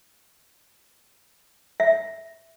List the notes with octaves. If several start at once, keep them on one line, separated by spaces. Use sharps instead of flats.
E5